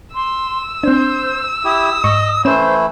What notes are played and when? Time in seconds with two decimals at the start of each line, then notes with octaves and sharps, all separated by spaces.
0.15 C6 E6
0.84 C4 D4 C5
1.65 E4 G4 D#6
2.04 G#2 D#5 C#6
2.45 E3 A3 C#4 E4 C5 E7